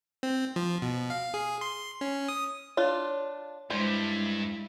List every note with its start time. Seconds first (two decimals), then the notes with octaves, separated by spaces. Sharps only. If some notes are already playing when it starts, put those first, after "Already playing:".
0.23 C4
0.56 F3
0.82 B2
1.10 F5
1.34 G#4
1.61 C6
2.01 C#4
2.28 D#6
2.77 D4 F4 C#5
3.70 G2 G#3 E4 C5 D5